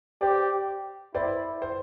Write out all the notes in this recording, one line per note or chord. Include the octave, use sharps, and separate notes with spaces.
G4 C5 D5
E4 C5 D5
C5